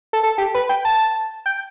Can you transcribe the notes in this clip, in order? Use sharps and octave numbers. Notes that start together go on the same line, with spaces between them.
A4
A4
G4
B4
G5
A5
G5